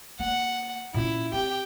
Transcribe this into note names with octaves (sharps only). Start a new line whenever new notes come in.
A#3 F#5
A#2 C#4 E4
C4 G4 G5